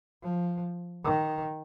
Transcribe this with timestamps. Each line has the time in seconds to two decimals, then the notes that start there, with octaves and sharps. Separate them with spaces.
0.23 F3
1.04 D#3